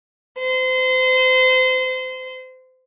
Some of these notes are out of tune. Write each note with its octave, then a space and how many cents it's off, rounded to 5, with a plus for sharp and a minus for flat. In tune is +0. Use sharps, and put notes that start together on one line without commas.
C5 -30